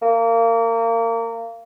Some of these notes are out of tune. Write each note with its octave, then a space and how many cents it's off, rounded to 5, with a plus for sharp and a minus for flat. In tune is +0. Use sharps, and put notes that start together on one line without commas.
A#3 -25